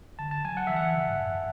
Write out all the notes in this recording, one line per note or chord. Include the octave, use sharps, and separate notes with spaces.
D3 A5
A5
F#3 G#5
F#5
E3 E5
F#5
E3
C#3
G#2
F#2